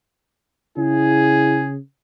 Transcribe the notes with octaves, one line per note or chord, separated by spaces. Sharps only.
C#3 E4 G#4